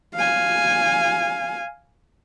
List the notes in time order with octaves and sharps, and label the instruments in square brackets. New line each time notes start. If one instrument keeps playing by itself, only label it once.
[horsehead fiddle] F5 G#5